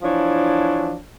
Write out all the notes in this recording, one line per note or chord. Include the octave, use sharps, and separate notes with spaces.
E3 F3 D4 C#5